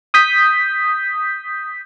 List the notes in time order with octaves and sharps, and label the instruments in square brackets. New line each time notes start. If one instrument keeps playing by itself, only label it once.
[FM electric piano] D#6 G6 B6